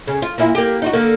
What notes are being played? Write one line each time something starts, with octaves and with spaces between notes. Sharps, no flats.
C#3
F4
A#2 A#3 E4
A#3 G4
D#4 F4 F#4
D3 A#3